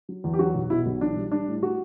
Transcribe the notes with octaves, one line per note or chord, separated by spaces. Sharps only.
F#3
E2
G4
F#3 F#4
B1
B2 E4
B1
E3 D4
G3
G3 D4
A2
F#4